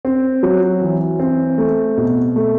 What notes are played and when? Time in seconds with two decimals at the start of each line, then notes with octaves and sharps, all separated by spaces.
0.05 C4
0.43 F#3
0.81 E3
1.19 C4
1.58 A3
1.97 B2
2.36 A3